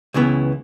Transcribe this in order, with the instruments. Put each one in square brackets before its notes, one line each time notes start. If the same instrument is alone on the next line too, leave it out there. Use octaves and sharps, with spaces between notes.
[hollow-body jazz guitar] C#2 C#3 E3 B3